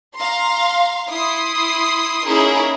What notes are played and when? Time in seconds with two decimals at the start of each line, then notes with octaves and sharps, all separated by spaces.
0.16 F5 A#5 C6
1.10 E4 C6 D#6 C7
2.26 A#3 C#4 D#4 E4 G#4 A#4